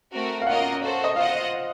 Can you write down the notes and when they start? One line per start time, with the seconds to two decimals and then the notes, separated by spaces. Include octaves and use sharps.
0.12 A3 C4 F#4 A#4
0.42 F5
0.46 A#3 C#4 F4 A#4 D#5 F#5
0.81 F#4 A4 C5
1.04 D#5
1.16 F4 C5 D#5 F5 F#5